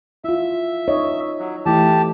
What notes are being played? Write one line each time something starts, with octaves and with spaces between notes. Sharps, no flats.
E4 F4 E5
D#4 C#5 D#5
F#3
E3 A3 E4 G4 A5